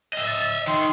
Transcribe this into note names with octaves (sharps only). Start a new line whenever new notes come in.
D#5 E5
A6
E6
D#3 C6